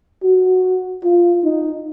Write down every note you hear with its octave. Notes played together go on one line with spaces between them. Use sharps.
F#4
F4
D#4